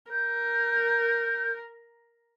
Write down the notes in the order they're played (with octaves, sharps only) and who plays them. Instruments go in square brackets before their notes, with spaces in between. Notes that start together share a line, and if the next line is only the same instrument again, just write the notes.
[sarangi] A#4 [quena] G6